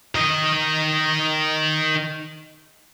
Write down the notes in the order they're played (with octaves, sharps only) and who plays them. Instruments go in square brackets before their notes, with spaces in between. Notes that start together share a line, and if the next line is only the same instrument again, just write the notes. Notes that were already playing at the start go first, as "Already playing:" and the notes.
[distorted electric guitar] D#3 D#5